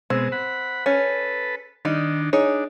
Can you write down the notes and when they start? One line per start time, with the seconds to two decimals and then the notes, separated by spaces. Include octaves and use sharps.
0.10 B2 G#3 C4
0.32 F#5 B5
0.86 C#4 A4 B4
1.85 D#3 G3 D4 D#4
2.33 D4 D#4 G#4 C#5